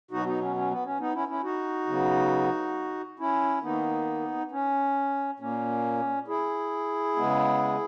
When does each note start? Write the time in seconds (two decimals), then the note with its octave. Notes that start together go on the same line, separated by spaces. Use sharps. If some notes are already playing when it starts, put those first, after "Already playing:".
0.11 B2 F#3 B3 D#4 F#4
0.26 B3 D#4
0.41 C#4
0.56 C#4
0.71 B3
0.85 C#4
1.00 B3 D#4
1.14 C#4 E4
1.28 C#4 E4
1.43 D#4 F#4
1.87 C#3 F#3 B3
3.19 C#4 E4
3.63 D#3 A#3 B3 D#4
4.52 C#4
5.39 A#2 A#3 C#4
6.27 E4 G#4
7.16 C#3 G#3 B3